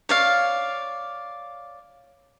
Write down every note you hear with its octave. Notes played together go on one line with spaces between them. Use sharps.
C#5 D5 F5